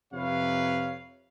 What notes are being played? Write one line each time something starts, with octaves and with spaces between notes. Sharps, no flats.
F2 C3 B4 C#5 F5